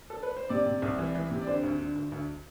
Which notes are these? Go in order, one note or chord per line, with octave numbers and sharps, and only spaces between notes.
A4
B4
C5
C3 D5
C3
C2
E3
E3
C3
D5
D3 C5
D2
D3
D2
D2